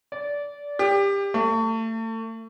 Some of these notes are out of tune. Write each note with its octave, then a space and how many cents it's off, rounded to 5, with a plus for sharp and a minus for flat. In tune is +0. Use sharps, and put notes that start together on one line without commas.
D5 -20
G4 +25
A3 +35